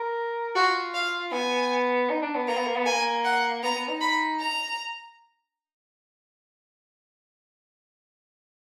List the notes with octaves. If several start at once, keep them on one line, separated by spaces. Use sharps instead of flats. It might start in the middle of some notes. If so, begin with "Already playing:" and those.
Already playing: A#4
F4 F#4
F5
B3 G#5
D#4
D4
B3
A#3 A#5
B3
A#3
B3
A#3 G#5
F#5
B3 A#5
B3
D#4
B5
A#5